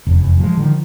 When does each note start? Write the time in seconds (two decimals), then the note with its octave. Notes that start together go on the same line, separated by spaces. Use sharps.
0.07 F1 E2
0.40 F3 G3 G#3
0.57 D3 D#3 F3